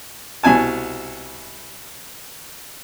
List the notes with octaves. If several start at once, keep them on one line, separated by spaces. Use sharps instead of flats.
C2 B2 G#5 A5